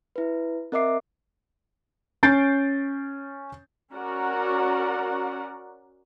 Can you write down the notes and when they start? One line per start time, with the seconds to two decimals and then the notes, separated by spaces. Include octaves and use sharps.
0.16 E4 B4
0.72 C4 A#4 D#5 E5 D6 C7
2.23 C#4 G6 A6 C7 D7
3.93 C#4 F#4 A#4 D5 F#5